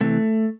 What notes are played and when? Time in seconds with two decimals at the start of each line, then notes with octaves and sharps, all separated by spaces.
0.01 C3 E3 A3